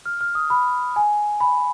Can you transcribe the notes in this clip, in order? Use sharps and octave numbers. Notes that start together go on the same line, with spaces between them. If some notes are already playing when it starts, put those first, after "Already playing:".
F6
F6
D#6
B5
G#5
B5